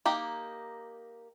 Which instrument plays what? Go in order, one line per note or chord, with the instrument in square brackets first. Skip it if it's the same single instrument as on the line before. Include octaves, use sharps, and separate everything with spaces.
[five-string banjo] A#3 D#4 G4